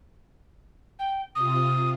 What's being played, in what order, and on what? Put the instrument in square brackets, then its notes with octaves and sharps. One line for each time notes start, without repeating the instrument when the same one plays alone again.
[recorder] G5
[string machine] C3 F4 [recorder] D#6